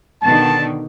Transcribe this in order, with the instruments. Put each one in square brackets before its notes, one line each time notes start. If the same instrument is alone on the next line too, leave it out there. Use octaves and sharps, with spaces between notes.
[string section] B2 D3 D#3 [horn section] A5